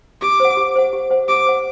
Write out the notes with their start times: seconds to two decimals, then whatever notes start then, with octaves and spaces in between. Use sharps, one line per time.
0.22 G4 D6
0.40 C5 F#5
0.57 G4
0.76 C5 F#5
0.93 G4
1.10 C5 F#5
1.28 G4 D6
1.46 C5 F#5